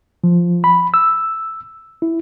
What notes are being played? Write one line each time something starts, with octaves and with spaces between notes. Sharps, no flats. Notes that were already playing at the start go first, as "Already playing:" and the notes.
F3
B5
E6
E4